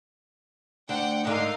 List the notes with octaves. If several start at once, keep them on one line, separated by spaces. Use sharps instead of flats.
D2 D4 F#5 G5
G#2 D3 D#4 A#4 F5